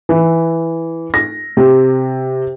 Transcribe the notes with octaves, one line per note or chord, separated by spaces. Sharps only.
E3
A#6
C3